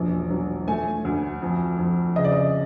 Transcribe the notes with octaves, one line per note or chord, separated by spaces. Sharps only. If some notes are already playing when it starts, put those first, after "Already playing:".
Already playing: E1 A#1
F#3
A3 G#5
D2
F2
F2
C#3 D#5
D5
D#5